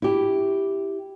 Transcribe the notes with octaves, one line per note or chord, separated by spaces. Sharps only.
E4 G4